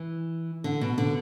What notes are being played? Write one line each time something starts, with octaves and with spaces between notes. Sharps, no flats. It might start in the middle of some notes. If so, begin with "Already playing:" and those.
Already playing: E3
D3
B2
D3